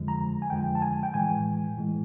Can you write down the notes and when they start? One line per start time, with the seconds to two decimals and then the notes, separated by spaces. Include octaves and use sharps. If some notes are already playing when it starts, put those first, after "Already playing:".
Already playing: F2 D3 F3 G#3
0.08 A#5
0.42 G#5
0.50 F2 D3 F3 G#3 G5
0.75 A5
0.82 G#5
1.03 G5
1.14 A2 E3 G#3 G#5
1.77 A2 E3 G#3